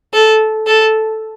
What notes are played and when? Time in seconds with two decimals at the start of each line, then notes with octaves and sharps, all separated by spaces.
0.14 A4
0.67 A4